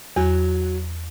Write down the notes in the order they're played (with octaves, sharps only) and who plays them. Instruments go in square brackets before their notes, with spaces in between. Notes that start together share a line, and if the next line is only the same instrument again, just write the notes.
[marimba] E2 [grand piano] F#3